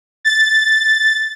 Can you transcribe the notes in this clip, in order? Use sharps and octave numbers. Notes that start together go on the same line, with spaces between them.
A6